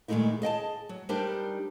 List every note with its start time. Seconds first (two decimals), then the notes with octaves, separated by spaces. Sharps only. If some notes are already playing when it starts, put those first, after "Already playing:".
0.08 A#2 D#3 G#3 A3 D#4 E4
0.42 G#4 D#5 G5 A5
0.89 F#3
1.09 G3 D4 D#4 G4 A#4 C5